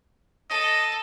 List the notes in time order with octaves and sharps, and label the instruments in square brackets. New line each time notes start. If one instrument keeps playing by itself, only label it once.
[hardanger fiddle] A4 [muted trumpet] D#5